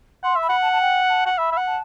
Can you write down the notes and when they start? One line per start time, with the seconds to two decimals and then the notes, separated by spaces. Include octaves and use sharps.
0.23 F#5 C6
0.36 E5
0.42 B5
0.49 F#5
0.62 A5
0.72 A5
0.81 G5
1.09 A5
1.26 F#5
1.38 E5 B5
1.52 E5
1.57 F#5
1.66 A5